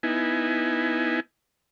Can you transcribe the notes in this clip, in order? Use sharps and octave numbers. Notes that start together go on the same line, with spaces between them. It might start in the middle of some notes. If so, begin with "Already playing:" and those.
B3 D#4 E4 G#5